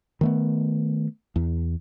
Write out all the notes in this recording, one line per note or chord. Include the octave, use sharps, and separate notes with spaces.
D#3 A3 B3
E2